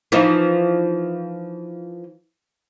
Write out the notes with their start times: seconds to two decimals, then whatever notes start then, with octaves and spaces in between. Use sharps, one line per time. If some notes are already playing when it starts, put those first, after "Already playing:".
0.12 E3 F3 D#4